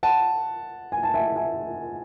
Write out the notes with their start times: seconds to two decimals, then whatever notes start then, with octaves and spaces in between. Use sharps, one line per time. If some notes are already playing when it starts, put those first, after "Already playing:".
0.03 F#5 A5
0.92 G#5
1.03 A5
1.14 E5 G#5
1.36 E5 G#5